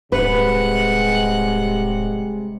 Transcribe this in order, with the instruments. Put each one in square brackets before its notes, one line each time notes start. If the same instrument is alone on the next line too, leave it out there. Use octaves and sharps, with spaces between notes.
[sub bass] D1 [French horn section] C3 G3 G#3 [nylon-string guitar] B4 [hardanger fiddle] F#5